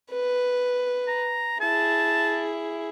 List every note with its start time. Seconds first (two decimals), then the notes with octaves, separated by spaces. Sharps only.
0.11 B4
1.08 A#5
1.61 E4 G#4 A5